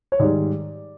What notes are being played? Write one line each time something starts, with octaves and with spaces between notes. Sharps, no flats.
C#5
G#2 D#3 G3 D5